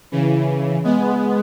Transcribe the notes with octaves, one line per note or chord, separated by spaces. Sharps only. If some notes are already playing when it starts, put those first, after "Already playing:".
C#3 E3
G#3 B3